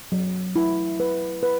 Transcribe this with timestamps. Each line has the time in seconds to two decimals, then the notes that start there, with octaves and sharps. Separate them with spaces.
0.12 F#3
0.56 E4
1.00 B4
1.43 B4